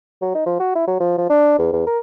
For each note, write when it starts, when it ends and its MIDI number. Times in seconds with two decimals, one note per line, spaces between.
0.22 0.32 54
0.34 0.45 63
0.46 0.57 53
0.60 0.75 66
0.75 0.87 64
0.87 0.96 54
1.00 1.15 53
1.18 1.29 53
1.30 1.54 62
1.58 1.72 40
1.73 1.85 40
1.87 1.98 70